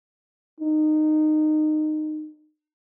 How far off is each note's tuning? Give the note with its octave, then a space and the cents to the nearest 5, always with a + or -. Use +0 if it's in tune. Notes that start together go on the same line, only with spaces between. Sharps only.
D#4 -20